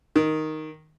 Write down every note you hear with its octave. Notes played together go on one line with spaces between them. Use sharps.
D#3